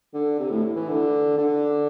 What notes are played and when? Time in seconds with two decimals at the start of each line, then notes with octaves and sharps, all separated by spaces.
0.14 D3
0.39 C3
0.51 A2
0.76 E3
0.89 D3
1.38 D3